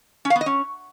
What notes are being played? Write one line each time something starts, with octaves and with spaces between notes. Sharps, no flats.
C#4
F5
B3
D#5
C#4